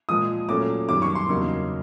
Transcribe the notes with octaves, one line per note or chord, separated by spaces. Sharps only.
A#2 F3 G#3 D#6
A#2 F#3 A3 C#4 D6
F#2 D#3 G3 D6
C#6
C6
E2 C#3 F#3 A#3 D#4